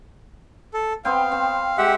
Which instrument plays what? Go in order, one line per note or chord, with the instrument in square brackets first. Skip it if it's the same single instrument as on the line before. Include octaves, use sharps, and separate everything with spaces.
[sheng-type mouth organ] A4
[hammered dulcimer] B3 C4 G5 [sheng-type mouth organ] F5
[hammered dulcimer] C4
[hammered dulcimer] G#3 [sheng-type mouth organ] G4 E5 F#5